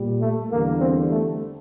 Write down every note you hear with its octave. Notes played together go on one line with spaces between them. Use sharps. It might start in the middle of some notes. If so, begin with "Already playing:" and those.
Already playing: A#2 G3
A3
E2 D3 G3 A#3
C4
A3